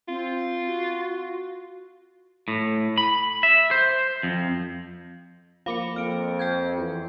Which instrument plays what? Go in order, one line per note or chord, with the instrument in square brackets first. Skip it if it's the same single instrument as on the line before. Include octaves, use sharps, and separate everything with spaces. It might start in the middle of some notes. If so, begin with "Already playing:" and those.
[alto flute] C4 [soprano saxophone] F4
[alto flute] F#4
[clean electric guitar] A2
B5
E5
C5
F2
[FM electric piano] F3 A#3 C#7 [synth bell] F5 B5 D6
[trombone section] F2 [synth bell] F6 D7
[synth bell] G5 G6 G#6
[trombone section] E2